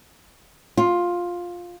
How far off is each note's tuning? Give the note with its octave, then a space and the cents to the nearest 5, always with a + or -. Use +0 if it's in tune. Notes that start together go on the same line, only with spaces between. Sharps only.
F4 +10